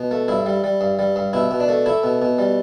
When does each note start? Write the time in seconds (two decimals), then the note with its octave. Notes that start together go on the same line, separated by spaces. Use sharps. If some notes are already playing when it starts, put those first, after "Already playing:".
Already playing: B2
0.11 A3
0.28 G2 E4
0.46 G3
0.64 G3
0.81 G2
0.99 G3
1.16 G2
1.33 B2 E4
1.51 B2
1.60 D4
1.69 A3
1.86 A3 E4
2.04 B2
2.22 B2
2.39 G3